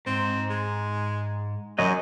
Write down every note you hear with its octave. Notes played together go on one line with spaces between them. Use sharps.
G#2 C4
G#3
F#2 F#3 F#4 D#5